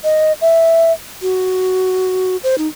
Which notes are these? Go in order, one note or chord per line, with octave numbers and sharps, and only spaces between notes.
D#5
E5
F#4
C5
D#4